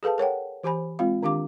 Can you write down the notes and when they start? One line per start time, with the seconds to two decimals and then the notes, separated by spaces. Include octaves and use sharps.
0.03 G#4 A4 B4 F5 A5
0.18 A#4 C#5 F#5 G5
0.63 E3 G4 C5 G#5 B5
0.99 G#3 C4 F4 F5
1.23 D#3 D4 G4 F5 D6